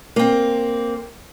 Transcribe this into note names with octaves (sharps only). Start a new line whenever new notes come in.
A#3 C4